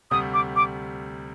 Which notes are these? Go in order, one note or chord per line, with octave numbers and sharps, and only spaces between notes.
D2 C3 G3 D#6
D6
D6